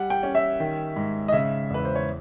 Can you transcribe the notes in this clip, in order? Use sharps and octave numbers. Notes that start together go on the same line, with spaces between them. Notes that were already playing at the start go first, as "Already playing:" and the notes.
Already playing: G3 F#5
G5
C#4
E5
D#3
G#2
D#5
C#3 E5
E2 B4
C5
C#5